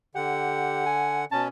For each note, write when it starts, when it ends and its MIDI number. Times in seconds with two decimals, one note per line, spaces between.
0.15 1.25 50
0.15 0.85 67
0.15 1.25 78
0.86 1.22 80
1.32 1.48 47
1.32 1.48 61
1.32 1.44 81